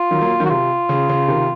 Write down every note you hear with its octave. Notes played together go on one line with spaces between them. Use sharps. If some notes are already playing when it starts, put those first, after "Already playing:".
Already playing: F4
D#3 F#3
F#3 A#3
D#3 F#3
F#4
C3 F4
C#3
C#3
C3 D#3